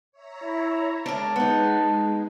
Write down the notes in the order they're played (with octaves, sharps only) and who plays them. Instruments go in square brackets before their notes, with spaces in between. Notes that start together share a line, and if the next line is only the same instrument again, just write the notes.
[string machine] C#5 E5 A#5
[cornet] E4
[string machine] G#3 [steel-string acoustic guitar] D4 A#4 [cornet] A5
[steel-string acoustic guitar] B3 D#4